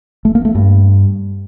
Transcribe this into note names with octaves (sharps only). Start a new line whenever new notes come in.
A3
A#3
A3
G2